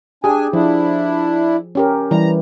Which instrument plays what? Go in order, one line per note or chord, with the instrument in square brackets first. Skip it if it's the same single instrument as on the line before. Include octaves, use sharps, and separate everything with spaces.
[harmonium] D4 G#5 [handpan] G4 G#4
[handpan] F3 [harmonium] D4 E4
[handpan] C#4 G4 A#4
[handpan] E3 G3 [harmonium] A#5